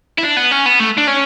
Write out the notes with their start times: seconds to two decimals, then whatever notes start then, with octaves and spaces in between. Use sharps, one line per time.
0.18 E4
0.23 D4
0.37 B3
0.51 C#4
0.66 B3
0.80 A3
0.98 D4
1.07 C#4